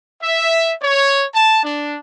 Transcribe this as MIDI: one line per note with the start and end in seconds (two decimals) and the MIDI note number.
0.21 0.72 76
0.81 1.25 73
1.32 1.60 81
1.63 1.97 62